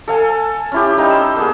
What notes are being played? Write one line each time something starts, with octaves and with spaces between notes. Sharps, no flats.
A4 F5 G#5
C#4 E4 G4
G3 D#4 F5
C6 E6
A#3 B3 G#4